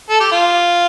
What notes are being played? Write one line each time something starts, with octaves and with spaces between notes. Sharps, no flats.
A4
G4
F4